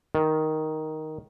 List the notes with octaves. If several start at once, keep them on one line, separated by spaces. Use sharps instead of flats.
D#3